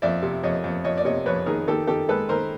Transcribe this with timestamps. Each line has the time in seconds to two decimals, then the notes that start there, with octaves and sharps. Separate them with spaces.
0.02 F2 D5 E5
0.22 C3
0.43 F2 C#5 D#5
0.64 F2
0.84 F2 C#5 D#5
0.98 D5
1.05 C3 C#5 D#5
1.26 F2 B4 C#5
1.46 D#3 G#4 A#4
1.68 D#3 G4 A4
1.87 D#3 G4 A4
2.09 G#3 A4 B4
2.29 D#3 A#4 C5